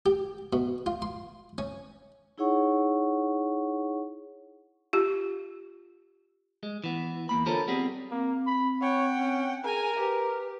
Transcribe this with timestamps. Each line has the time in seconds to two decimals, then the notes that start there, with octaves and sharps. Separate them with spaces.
0.06 G4
0.53 B2
0.86 F4
1.02 C6
1.58 C#4
2.38 D#4 E4 G#4 C#5 F#5 C#6
4.93 F4 G4
6.63 G#3
6.84 E3 B3
7.29 E2 A#3 B5
7.46 D3 F4 A4 A#4 C5 C#5
7.68 G3 B3 C4 G4 G#4
8.11 A#3 C4
8.47 B5
8.81 C#5 F#5 G5
9.18 C#4
9.64 G#4 A#4 G#5 A#5
9.99 G4 B4